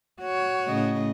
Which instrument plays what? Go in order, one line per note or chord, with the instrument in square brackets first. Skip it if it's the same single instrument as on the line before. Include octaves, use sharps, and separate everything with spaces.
[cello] F#4 C#5
[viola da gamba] A2 C#3 D#5